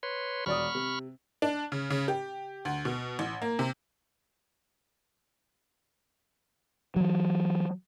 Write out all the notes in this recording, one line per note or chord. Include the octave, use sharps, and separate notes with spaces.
B4 C#5 C6
E1 D5 B5 C#6 D#6 F6
C3
D4
C#3
C#3
G4
D2
B2
A1
A#3
C3
E3 F#3